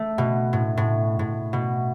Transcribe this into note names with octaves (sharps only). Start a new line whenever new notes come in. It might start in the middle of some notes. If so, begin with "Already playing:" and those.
Already playing: A3
B2
A2
A2
A2
B2